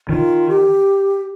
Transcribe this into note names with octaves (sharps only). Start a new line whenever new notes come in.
D#3 F4
G4